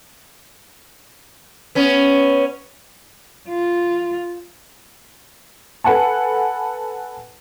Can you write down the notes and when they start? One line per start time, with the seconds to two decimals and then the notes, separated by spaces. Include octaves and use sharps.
1.75 B3 C#4
3.49 F4
5.84 A4 B4 F#5 G#5 A5